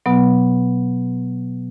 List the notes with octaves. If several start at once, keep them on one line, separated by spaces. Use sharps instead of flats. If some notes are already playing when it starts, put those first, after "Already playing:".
B2 F#3 B3